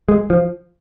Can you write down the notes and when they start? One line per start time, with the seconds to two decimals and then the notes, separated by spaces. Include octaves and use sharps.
0.08 G#3
0.30 F3